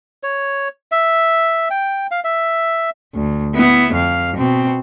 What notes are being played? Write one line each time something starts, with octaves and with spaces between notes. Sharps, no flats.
C#5
E5
G5
F5
E5
D2
B3 E4
F2 F5
B2 C4